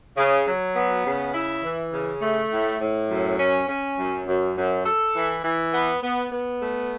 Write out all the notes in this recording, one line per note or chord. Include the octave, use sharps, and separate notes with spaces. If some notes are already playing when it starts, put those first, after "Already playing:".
C#3
F#3
B3
C#3
E4
E3
C#3
A3
A2
A2
F#2
C#4
C#4
F#2
F#2
F#2
A4
E3
E3
B3
B3
B3
A3